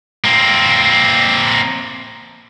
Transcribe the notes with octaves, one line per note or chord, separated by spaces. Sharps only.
A#3 C4